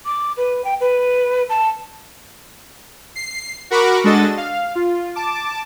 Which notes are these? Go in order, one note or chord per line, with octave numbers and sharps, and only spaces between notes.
D6
B4
G5
B4
A5
C7
F#4 A#4 F#5 B5 C#6 D6
G#3 D4 F#4 A4 D#5 A6
F5
F4
A5 D6